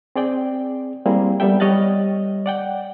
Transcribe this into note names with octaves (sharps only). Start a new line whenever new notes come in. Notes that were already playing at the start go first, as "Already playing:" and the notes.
C4 G#4 D5 G5
G3 A#3 C4 E4 G#4
G3 B3 A4 E5 G5
G3 C#5 D#5 F6 F#6 A6
D5 F#5 G5